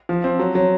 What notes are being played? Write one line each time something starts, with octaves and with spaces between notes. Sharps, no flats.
F3
C4
F#3
F#3